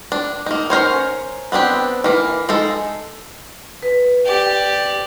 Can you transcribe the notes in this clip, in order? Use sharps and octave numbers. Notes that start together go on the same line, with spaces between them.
D4
A#3 D#4
C#4 A#4 C5 C#5
B3 C4 D4 G4
E3 A#3
G#3 D#4 A4
B4
G4 D5